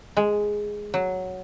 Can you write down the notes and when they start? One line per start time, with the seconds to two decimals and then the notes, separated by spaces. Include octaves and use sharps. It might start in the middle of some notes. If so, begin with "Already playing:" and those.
0.17 G#3
0.94 F#3